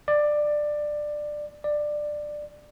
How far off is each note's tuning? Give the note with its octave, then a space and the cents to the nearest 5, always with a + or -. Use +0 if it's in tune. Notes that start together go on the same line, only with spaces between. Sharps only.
D5 +15
D5 +15